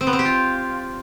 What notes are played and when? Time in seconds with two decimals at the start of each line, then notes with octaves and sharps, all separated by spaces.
0.01 C4
0.07 B3
0.13 C4
0.19 G4
0.25 F4